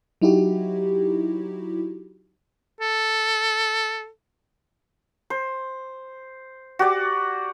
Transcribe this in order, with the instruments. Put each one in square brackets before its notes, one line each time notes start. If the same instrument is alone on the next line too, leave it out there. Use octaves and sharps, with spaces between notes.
[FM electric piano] F#3 D#4 E4 F#4 G4
[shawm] A4
[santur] C5
F#4 G4 D5